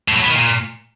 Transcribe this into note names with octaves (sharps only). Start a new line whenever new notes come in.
A2
F#3
B3
D#3
A#2